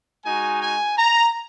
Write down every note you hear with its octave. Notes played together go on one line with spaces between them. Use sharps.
G#3 D#4 F#4 G#5
G#5
A#5